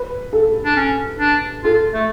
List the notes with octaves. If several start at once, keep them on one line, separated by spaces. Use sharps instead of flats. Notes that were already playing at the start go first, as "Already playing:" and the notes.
Already playing: B4
A4
D4
C#4
D4
F4 A4
A3